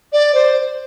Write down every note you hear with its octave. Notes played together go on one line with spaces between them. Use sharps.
D5
C5